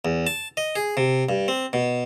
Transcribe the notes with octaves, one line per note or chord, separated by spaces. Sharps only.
E2
A5
D#5
G#4
C3
G2
C4
B2